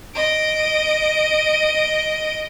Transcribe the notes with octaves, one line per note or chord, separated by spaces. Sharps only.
D#5 D7